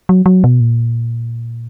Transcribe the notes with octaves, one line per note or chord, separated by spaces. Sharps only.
F#3
F#3
B2
A#2